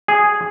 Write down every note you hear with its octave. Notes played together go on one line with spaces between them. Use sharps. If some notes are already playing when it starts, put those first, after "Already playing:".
G#4